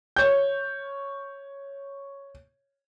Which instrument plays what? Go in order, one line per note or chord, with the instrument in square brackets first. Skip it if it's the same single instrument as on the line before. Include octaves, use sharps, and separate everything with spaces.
[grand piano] C#5 G6